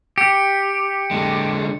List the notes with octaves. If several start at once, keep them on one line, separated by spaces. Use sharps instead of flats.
G4 C#7
D3 G#3